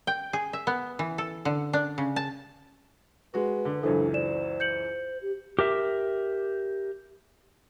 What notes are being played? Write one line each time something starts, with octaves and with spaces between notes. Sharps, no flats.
G5
G#4
E5
B3
E3
A4
D3
D4
C#3
A5
G#3 F#4 B4
D3
C#2 F#2 E3 D4 A4 C5
C5 D5 E7
G6 C#7 F#7
G4
G4 A#4 E5